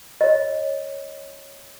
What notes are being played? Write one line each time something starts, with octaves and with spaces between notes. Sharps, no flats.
C#5 D#5